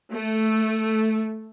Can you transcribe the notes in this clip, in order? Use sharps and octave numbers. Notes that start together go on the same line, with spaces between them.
A3